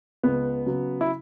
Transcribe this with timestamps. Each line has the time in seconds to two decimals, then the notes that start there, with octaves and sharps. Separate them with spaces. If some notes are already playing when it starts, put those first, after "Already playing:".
0.23 C#2 B3
0.66 C#3 F#3
1.01 E4